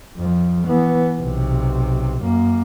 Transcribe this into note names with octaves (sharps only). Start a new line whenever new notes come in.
F2 F3
E3 B3
B1 C3
F#2 A#3